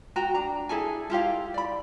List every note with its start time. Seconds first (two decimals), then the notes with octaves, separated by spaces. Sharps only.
0.16 F#4 G5 A#5
0.34 D4 A#5
0.69 E4 G#4 A4 G#5
1.10 E4 F4 G4 F5
1.54 D5 B5